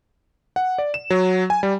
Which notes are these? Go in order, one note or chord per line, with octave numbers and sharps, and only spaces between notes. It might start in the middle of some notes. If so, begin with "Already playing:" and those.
F#5
D5
E7
F#3
G#5
G3